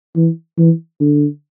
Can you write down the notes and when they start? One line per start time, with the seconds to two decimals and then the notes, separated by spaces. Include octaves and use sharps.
0.16 E3
0.58 E3
1.01 D3